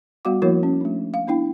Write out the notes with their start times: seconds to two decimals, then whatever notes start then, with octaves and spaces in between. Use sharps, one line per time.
0.25 G3 B3 F#4 F5 F#5 D6
0.42 F3 A#3 E4 F#4 A#4 C#5
0.63 C#4
0.81 A3 D4
1.14 F5
1.27 B3 D4 E4 G5